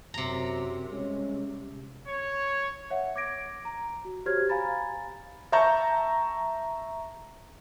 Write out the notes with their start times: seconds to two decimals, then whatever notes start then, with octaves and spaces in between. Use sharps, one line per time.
0.14 F#2 C3 A#5
0.91 G3 G#3 C#4
2.08 C#5
2.90 C#5 E5 F#5
3.15 C#5 D6 G#6 A#6 D7
3.65 A#5
4.05 F#4
4.26 F#4 G4 C5 C#5 F6 G#6
4.49 F5 G#5 A#5 B5 A6
5.52 E5 A5 A#5 C#6 G6